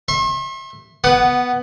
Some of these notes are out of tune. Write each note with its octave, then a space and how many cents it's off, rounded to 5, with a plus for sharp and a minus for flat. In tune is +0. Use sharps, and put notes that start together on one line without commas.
E5 +0 C6 +45
B3 +0 F#5 +15 D#6 -25